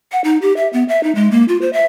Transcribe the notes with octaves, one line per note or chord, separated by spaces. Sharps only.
F#5
D#4
G4
E5
B3
E5
D#4
G#3
A#3
F4
C5
E5